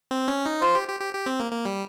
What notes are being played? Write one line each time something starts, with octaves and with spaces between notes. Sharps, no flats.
C4
C#4
D#4
F4 C5
G4
G4
G4
G4
C4
A#3
A#3
G3